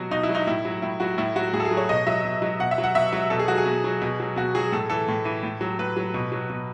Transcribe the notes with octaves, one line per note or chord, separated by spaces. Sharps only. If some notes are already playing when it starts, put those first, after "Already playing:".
Already playing: B2 F#3 F#4
B2 D#4
E4
F#3
D#4
A2 E4
F#3
A2 E4
F#3 F#4
A2 E4
F#3 F#4
A2 G#4
A4
G#4
F#3
C#5
B2 D#5
F#3 E5
B2
F#3
B2 F#5
E5
F#3
F#5
B2 E5
F#3
B2 A4
G#4
F#3 F#4
G#4
B2
F#3
B2
F#3
B2 F#4
F#3 G#4
A2 A4
E3 A4
A2
E3
A2
F#3
A2 B4
F#3
B2
F#3
B2